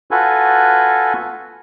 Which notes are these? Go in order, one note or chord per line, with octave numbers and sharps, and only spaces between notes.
F4 F#4 A4 B4 G#5